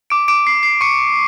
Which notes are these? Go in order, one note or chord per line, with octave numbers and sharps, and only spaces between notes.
D6 D7
D6 D7
C7
C7
C#6 C#7